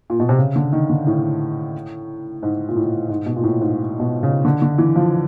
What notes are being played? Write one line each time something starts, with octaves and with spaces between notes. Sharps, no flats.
A#2
B2
C3
C#3
D3
D#3
D3
A2
G#2
A#2
A2
G#2
B2
A#2
A2
G#2
B2
C#3
D3
D3
E3
F3